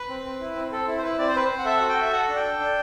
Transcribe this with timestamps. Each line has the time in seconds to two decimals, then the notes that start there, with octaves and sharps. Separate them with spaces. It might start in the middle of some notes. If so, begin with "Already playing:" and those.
Already playing: B4
0.09 C4
0.25 C4
0.40 E4
0.56 C4
0.72 C4 A4
0.87 E4
0.98 C5
1.03 E4 B4
1.18 C4 D5
1.27 C5
1.34 C4 B4
1.45 C5
1.50 C4
1.59 F#5
1.66 A4 E5
1.77 F#4 F#5
1.89 G5
1.97 F#4 E5
2.12 A4 F#5
2.29 D4
2.36 G5
2.44 A4
2.60 D4